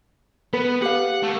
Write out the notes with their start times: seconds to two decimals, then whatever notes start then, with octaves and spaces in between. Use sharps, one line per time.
0.53 B3 B4
0.82 G4 B4 F5 F#5
1.23 A3 A#3